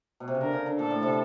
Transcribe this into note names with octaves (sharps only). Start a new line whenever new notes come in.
B2
C3
C#3
D3 A#4
C#3
D3
A#2 A4
A2
C3